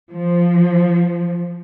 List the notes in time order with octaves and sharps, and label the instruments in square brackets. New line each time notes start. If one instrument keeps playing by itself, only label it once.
[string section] F3